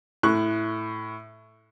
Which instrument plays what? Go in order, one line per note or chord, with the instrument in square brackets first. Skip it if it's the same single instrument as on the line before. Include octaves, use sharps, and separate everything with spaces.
[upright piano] A2 C#6 F#6